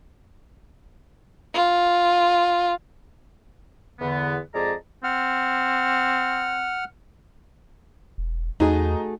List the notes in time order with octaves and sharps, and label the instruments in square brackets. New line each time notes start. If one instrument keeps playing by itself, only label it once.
[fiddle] F4
[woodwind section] E2 D3 B3
F2 G#3 G#4 D5 A5 A#5
[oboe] C4 [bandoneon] F#5 F6
[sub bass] E1
[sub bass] E2 [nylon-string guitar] A3 F#4 G#4 [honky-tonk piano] D#4